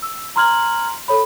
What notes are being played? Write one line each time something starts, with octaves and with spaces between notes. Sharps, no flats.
E6
A#5 C6 F6 G#6 F#7
A4 C#5 B5